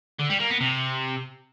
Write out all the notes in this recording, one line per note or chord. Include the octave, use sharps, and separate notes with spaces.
D3
G3
A#3
B3
C3